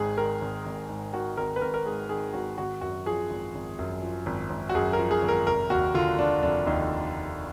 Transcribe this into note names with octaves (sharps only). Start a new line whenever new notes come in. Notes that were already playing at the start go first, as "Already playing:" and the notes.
Already playing: G#1 G#2 G#4
D#3 A#4
G#1
G#1
G#2
D#3 F#4
G#1 A#4
B4
G#1 A#4
A#4
G#2 G#4
D#3 G#4
G#1 F#4
G#1 F#4
F#2 F#4
F3 G#4
G#1
G#1
F#2
F3
G#1
G#1
F#4
F#2 G#4
A#4
F3
G#4
G#1
A#4
F1 A#4
D#2 F#4
D3 F4
F3 D4
F1 D4
D#2 D#4